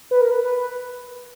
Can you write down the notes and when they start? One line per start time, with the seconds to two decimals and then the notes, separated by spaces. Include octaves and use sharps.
0.11 B4
0.21 A#4
0.31 B4
0.44 B4